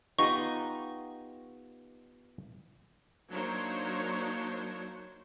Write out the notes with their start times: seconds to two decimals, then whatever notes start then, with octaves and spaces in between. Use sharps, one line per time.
0.19 B3 D#4 F4 G4 D#5 C#6
3.31 F#3 A#3 D4 D#4 C5 C#5